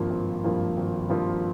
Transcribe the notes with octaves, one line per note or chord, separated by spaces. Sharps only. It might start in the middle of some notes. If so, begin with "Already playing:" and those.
Already playing: G#1 G2 F3 A#3 F4
G#1
G2 F3 A#3 F4
G#1
G2 F3 A#3 F4